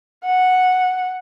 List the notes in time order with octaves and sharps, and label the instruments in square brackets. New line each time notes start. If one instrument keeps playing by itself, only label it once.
[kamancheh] F#5